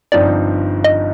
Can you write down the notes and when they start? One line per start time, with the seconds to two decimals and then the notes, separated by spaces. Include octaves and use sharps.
0.12 G1 G2 F3 C4 D#4 D5
0.84 D#5